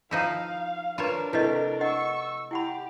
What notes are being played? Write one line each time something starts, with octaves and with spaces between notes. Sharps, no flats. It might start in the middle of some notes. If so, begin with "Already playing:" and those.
F3 D#4 E4 F5 A#5
D4 F4 A#4 B4 C#5 A#5 B5
C3 A3 E4 B4 D#5
D#5 F#5 C#6 E6
E4 G4 F#5 B5